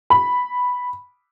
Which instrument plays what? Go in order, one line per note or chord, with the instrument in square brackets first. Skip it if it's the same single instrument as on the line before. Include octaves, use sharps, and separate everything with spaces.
[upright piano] B5